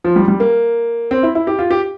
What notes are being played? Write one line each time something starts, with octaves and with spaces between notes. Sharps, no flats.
F3
G3
G3
A#3
C4
E4
E4
G4
F4
G4